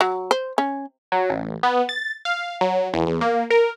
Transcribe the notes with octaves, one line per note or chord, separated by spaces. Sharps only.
F#3
C5
C#4
F#3
A1
B3
A6
F5
F#3
E2
E2
A#3
A#4